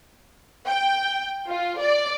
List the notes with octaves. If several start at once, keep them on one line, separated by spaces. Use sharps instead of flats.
G5
F4
D5